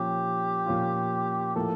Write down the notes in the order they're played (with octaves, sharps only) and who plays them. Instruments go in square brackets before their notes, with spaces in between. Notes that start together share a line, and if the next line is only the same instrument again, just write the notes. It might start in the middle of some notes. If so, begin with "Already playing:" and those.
Already playing: [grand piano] A#2 F3 C#4 F4 [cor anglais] G4
[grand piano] A#2 F3 C#4 F4
[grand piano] A2 F3 A#3 [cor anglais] A4